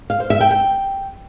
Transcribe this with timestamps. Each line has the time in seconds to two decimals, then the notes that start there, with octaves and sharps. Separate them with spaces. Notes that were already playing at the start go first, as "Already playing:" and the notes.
0.10 F5
0.20 C5
0.30 E5
0.40 G5
0.51 G5